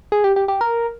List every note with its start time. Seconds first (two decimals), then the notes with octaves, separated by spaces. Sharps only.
0.12 G#4
0.24 G4
0.36 G4
0.48 G4
0.61 A#4